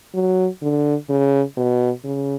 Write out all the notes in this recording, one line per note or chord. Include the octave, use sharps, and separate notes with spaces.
F#3
D3
C#3
B2
C#3